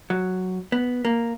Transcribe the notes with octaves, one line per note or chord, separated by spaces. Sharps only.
F#3
B3
A#3